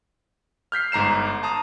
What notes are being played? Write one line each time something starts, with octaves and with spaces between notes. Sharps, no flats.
F6 G6 B6 C7
G1 G#2 A#5 C7 E7
A5 A#5 D#6